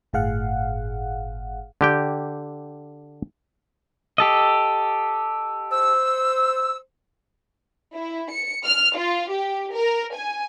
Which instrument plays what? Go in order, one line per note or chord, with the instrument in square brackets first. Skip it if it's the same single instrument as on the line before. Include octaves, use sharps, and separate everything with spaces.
[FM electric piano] G1 A2 G#4 F5 F#5
[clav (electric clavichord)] D3 G4 G5
[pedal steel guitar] G4 A4 D#5
[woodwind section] C5 E6
[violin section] E4
C#7
F6
F4
G4
A#4
G#5